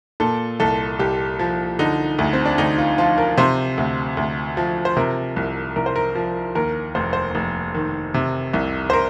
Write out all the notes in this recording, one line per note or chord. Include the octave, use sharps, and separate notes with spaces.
A#2 A4
C2 A4
C2 G4
F3
D3 D#4
D2
C4
D4
D2 D#4
F4
F3 F4
A#4
C3 C5
D2
D2
F3
C5
C3 A#4
C2
C2 A#4
C5
A#4
F3
D#2 A#4
F1 C5
C5
F1
D#3
C3
C2
C5
A#4